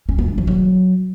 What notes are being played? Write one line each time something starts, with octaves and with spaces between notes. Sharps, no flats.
C#4
B3
D4
F3
F#3